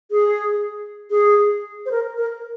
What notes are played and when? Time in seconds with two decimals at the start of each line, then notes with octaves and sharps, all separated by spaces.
0.11 G#4
1.10 G#4
1.86 C5
1.91 A#4
2.17 A#4